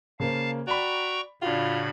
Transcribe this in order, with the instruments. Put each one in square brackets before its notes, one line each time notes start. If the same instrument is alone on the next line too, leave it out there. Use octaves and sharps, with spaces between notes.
[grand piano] C#3 A#3 C5 [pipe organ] F5 A5
[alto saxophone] F#4 [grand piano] D5 B5 [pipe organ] G5 A#5 C#6
[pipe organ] A2 C#3 B5 [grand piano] D4 F#4 [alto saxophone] F4